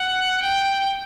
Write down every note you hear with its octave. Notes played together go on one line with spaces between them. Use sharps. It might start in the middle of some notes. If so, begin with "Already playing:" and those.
Already playing: F#5
G5